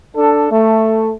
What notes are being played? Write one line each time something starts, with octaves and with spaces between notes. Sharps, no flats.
D4 A4
A3